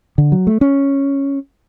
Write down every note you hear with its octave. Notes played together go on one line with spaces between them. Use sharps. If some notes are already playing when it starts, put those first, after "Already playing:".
D3
F#3
A3
C#4